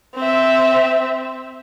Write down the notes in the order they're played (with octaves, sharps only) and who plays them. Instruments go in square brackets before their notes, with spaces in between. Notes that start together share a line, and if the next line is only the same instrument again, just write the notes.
[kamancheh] C4 E5